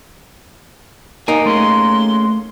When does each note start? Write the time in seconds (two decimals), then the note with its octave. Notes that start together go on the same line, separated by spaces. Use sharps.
1.28 A#3 D#4 G#5
1.45 A3 C#4 G#4 C6